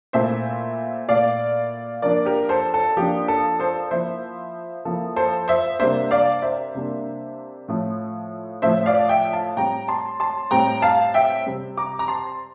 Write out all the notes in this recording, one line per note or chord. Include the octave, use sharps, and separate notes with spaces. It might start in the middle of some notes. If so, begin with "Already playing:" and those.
A#2 A3 E4 C5 E5
A#2 A3 E4 D5 F5
F3 A#3 D4 A#4 D5
G4 A#4
A4 C5
A4
F3 A#3 D4 G4
A4
A4 C5
F3 A#3 E4 C5 E5
F3 A#3 E4 A4
A4 C5
C5 E5
C3 G3 A#3 D4 C5 E5
D5 F5
C5 E5
C3 G3 A#3 D4
A2 F3 A3
A2 F3 A3 C5 E5
D5 F5
E5 G5
F5 A5
A2 G3 C4 G5 A#5
A5 C6
A5 C6
A2 G3 C4 G5 A#5
F5 A5
E5 G5
C3 G3 C4
A#5 D6
A#5
A5 C6